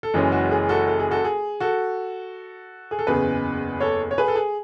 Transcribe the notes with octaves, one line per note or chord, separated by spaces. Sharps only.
A4
F#1 F#2 E3 G#3 C#4 G#4
F#4
G#4
F#4 A4
A4
G#4
F#4 A4
G#4
F#4 A4
G#4
A4
F#1 E2 C#3 G#4 B4
A4 C#5
C#5
G#4 B4
A4
G#4